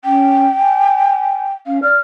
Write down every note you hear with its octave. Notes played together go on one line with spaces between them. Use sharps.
C#4 G5
G#5
C#4 F5
D5 F6